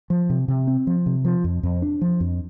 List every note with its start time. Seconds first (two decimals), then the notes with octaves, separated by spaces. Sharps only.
0.10 F3
0.30 C3
0.48 C3
0.67 C4
0.87 F3
1.06 C3
1.25 F3
1.44 F2
1.63 F2
1.82 D4
2.01 F3
2.20 F2